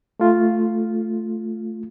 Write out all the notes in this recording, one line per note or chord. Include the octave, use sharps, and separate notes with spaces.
A3 F4